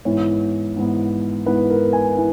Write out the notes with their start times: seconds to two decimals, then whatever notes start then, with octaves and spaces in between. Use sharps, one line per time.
0.05 G#2 E3 B3 C#5
0.76 G#2 E3 B3
1.46 G#2 E3 B3 B4
1.70 A#4
1.93 G#5
2.17 E3